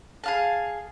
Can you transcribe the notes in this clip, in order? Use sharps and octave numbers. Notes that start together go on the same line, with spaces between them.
G#4 F5 A5